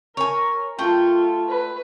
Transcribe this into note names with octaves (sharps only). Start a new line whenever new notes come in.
A#4 C#5 G#5
A3 F4 G5
B4